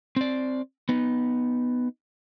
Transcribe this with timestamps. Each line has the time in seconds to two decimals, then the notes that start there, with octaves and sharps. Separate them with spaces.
0.16 C4 D5
0.89 B3 D#4